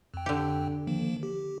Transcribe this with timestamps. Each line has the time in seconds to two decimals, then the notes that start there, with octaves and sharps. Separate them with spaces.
0.14 F2 G5
0.26 D3 G4
0.87 D#3 F3 A#3
1.23 G4